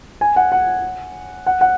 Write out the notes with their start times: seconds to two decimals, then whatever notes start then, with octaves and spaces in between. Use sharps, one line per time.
0.21 G#5
0.36 F#5
0.52 F#5
1.46 F#5
1.61 F#5